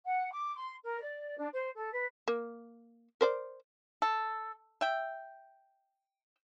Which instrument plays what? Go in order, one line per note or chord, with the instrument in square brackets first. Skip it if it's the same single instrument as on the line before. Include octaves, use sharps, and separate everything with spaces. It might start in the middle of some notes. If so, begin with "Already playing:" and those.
[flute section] F#5
D6
C6
A#4
D5
D4
C5
A4
B4
[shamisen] A#3
A#4 C5 D5
[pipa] A4
E5 G5